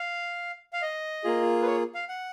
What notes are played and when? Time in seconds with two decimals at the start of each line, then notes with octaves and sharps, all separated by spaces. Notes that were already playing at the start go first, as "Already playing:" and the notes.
Already playing: F5
0.73 F5
0.82 D#5
1.24 A#3 F4 G#4
1.62 B4
1.66 C#5
1.95 F5
2.09 F#5